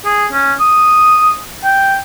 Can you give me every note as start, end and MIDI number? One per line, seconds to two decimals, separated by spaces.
0.05 0.26 68
0.32 0.53 61
0.60 1.37 87
1.64 1.98 79